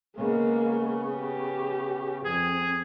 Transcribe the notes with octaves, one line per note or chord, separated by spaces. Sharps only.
C#3 G#3 A#3 B3
G4
F2 C4 G#4